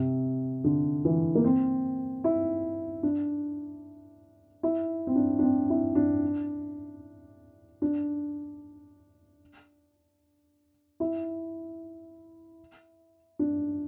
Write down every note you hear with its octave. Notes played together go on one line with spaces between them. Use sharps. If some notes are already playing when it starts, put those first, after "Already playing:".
Already playing: C3
D3
E3
A#3
C4
E4
D4
E4
C4
D4
D4
C4
E4
D4
D4
E4
D4